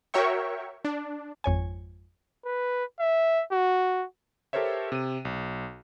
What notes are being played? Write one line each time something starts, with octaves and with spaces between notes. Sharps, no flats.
F#4 A#4 C#5 E5 G5 C#6
D4
G#1 F2 C#5 G#5
B4
E5
F#4
G4 A4 A#4 C5 C#5 E5
C3 D#7
B1